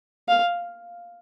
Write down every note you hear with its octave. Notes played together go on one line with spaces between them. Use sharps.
F5